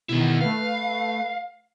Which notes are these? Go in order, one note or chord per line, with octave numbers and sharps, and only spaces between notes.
B2 D#3 B3 E4
A3 B4 F5